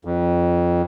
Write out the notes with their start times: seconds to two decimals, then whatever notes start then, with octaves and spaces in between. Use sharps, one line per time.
0.05 F2